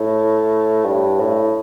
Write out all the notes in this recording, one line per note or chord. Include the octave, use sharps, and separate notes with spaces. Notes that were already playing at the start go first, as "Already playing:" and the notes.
Already playing: A2
G2
A2